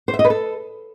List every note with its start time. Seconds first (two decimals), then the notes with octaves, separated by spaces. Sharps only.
0.08 C5
0.14 E5
0.19 D#5
0.25 B4
0.30 A4